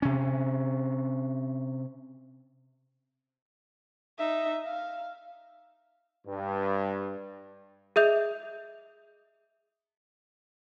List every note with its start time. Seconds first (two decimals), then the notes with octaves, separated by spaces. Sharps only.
0.02 C3 C#4
4.19 D#4 E5
4.65 F5
6.26 G2
7.96 G#4 D#5 E5 D#6 G6 F7